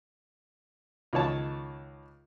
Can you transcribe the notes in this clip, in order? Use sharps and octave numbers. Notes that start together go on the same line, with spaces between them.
C#2 D#3 C#5 A5